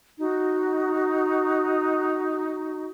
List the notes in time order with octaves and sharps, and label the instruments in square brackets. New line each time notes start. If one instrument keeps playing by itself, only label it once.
[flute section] D#4 F#4